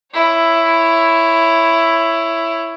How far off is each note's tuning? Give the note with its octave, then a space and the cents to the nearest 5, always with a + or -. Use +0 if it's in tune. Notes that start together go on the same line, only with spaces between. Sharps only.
E4 +10 C#5 +0